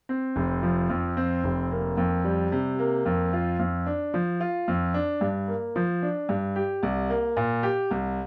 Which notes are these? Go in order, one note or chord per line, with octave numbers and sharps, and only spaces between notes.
C4
F1
F3
F2
C4
F1
A#3
F2
G3
C3
A#3
F2
F4
F2
D4
F3
F4
F2
D4
G2
A#3
F3
D4
G2
G4
C2
A#3
A#2
G4
C2